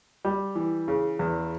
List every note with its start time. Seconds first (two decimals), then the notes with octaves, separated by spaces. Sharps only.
0.25 G3
0.55 E3
0.88 C#3
1.19 E2